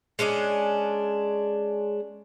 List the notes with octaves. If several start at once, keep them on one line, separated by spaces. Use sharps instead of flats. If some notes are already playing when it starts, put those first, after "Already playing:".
G#3 C#4 D4 D#5